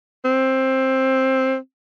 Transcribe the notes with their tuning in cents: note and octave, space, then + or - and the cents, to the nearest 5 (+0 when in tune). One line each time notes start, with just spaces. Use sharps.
C4 +15